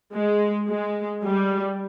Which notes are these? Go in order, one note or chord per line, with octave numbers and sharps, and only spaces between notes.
G#3
G#3
G3